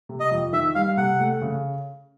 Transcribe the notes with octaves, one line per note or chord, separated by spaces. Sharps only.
C3
D#5
F2
D#3 E5
G3 F5
C3 F#5
A3
C#3